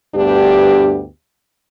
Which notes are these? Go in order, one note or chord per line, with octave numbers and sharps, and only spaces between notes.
D2 G2 B3 D4 G4